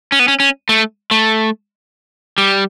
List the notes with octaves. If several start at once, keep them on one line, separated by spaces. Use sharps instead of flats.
C#4
B3
C#4
C#4
A3
A3
G3